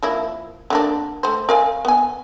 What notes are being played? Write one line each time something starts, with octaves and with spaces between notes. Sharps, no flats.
F3 A#3 E4
D3 A#3 D4
A3 C5
A#4 F5 G#5
B3 G#5